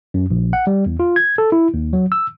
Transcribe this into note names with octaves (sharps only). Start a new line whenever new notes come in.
F#2
A#1
F#5
G3
E2
F4
G#6
A4
E4
D#2
F#3
E6